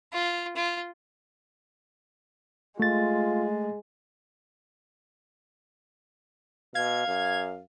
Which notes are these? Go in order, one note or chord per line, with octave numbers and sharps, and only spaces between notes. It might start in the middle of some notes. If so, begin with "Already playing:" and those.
F4
F4
G#3 A3 F4 A6
B2 F5 G#6
F#2